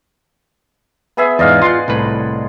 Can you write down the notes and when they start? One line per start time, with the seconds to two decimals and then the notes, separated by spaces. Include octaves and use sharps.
1.17 B3 G#4 E5
1.39 E2 G#2 D5 D#5 F5
1.62 F4 F#5 C6
1.88 C2 A2 B4